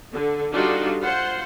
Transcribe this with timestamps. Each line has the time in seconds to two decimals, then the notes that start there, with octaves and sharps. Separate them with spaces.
0.13 D3
0.53 G3 D4 D#4 F4 F#4 A4
1.00 F4 C5 F#5 C6